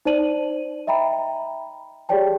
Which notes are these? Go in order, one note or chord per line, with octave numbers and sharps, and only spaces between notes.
D#4 C5 D5 A5 D#7 F#7
D#5 E5 G5 A#5 B5
G4 G#4 C#5 D5 G5 A5